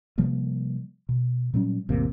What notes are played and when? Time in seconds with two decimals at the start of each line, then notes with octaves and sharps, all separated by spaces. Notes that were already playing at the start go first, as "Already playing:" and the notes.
0.18 C3 F3 G3 A#3
1.09 B2
1.54 A#2 F#3 G3 C#4
1.89 A1 E2 C3 A#3